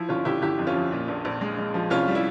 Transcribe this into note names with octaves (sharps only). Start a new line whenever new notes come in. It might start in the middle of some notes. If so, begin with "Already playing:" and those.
Already playing: F3 E4
G1 C#4 F4
G1 E4 G4
G1 E4 G4
F2
C#4 F4
F3
A#2
A#1
A#1
G#3
G#3
F3
C2 C#4 F4
G3
E4